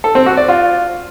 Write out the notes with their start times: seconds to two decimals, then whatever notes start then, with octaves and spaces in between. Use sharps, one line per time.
0.04 A4
0.15 C4
0.26 F#4
0.37 D5
0.48 F4